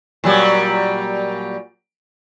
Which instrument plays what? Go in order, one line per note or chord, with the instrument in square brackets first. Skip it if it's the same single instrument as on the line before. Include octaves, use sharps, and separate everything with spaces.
[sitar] A#2 F#3 G3